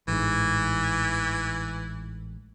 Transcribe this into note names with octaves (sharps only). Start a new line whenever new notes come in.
A1 G#2 E3